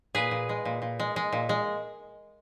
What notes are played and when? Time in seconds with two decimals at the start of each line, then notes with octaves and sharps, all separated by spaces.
0.15 A#2 G#4 B4
0.31 A#2
0.49 G#3
0.65 A#2
0.82 A#2
1.00 G#3
1.16 G#3
1.33 A#2
1.49 G#3